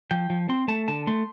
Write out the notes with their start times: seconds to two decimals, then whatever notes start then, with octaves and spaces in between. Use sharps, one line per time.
0.11 F3 G5
0.30 F3
0.49 C4 C6
0.68 A3 A5
0.88 D3 A5
1.07 A3 C6